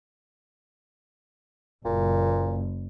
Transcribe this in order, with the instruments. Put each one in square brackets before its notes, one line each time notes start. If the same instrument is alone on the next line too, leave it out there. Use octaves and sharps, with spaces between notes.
[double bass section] F#1 [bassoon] A#2